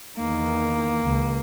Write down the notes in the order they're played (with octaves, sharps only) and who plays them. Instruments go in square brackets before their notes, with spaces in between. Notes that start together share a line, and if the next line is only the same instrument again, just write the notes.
[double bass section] E2 D#3 [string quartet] A#3
[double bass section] C#2